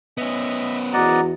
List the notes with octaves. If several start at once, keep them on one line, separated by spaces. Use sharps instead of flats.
B3 C#4 D#5 E5
E2 F#4 D5 D#5 F#5 A#5